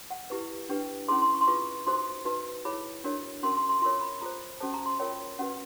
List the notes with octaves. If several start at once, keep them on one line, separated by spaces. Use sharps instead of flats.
F#5
E4 G4 B4
D4 G4 B4 G5
C#4 E4 G#4 C6
C6
C#6
C6
F4 G#4 B4 C#6
D#4 F#4 A4 C5 C6
D#4 F#4 B4
E4 G#4 C#5 B5
D4 F#4 A#4 C#5
C#4 F#4 A#4 C6
C6
C6
F4 A#4 C#5 C6
B5
F4 A4 C5 A#5
C#4 F#4 A4 C5 A5
A#5
C6
F4 A#4 C#5 G5
C#4 F#4 B4 F#5